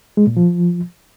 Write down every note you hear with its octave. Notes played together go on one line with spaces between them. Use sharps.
G#3
A#2
F3